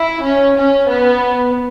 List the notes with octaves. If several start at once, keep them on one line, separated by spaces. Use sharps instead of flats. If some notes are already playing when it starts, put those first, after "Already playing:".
Already playing: E4
C#4
C#4
B3